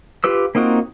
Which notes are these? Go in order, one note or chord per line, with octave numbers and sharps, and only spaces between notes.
F4 G4 B4 E6
A#3 C4 D#4 F4 F#4